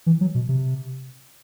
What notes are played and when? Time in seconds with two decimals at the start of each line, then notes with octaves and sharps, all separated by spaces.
0.06 E3
0.21 F#3
0.35 B2
0.49 C3